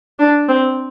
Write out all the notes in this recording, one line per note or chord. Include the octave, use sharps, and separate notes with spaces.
D4
C4